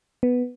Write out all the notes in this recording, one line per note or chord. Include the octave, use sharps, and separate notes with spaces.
B3